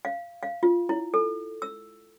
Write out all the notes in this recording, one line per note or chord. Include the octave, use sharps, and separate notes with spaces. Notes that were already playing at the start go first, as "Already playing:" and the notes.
F5
F5
F4
E4
A4
E6